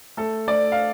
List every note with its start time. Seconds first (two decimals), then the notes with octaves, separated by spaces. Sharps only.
0.17 A3 A4
0.47 A3 D5
0.72 F5